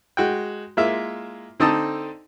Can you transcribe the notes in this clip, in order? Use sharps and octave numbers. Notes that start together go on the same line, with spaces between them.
G#3 F#4 G5
G#3 A#3 E4 F4 E5
D3 C4 D#4 A4 A5 D#6